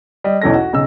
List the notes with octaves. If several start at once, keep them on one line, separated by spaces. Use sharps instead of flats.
G3 D#5
B1 E2 E3 C#4 A4 A#6
F#4
B1 C#3 E6